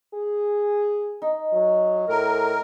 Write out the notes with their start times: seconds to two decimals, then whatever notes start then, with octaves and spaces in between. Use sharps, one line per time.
0.14 G#4
1.22 D#4
1.53 F#3
2.09 A2 A#4